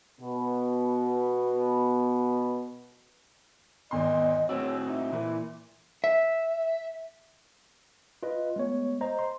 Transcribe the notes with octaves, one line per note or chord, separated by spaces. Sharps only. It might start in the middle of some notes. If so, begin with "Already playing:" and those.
B2 B3
G#1 E2 D#5 C6
A2 C4 F#4 C#5 E6
D#4 E5
A#2 E3
E5
F4 B4 D#5
G#3 A3 B3 C#5
C5 D#5 A#5
C6